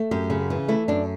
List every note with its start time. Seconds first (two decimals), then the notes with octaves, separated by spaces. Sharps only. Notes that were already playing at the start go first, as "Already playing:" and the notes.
Already playing: A3
0.11 F#2 G4
0.30 C#3
0.50 E3
0.68 A3 E4
0.88 F#2 D4